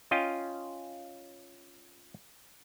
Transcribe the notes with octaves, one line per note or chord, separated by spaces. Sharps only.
C#4 F4 D#5 G5